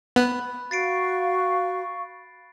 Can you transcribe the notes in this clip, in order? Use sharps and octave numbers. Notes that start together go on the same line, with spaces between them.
B3 B5 F#6
F#4 F5 C#6 A6 C7 D7